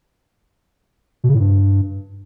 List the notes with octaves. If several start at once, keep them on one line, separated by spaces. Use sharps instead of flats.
B2
C#3
A2
G2